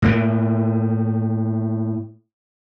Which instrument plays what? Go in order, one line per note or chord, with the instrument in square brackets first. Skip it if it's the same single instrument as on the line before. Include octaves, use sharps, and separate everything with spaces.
[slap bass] A2 A#3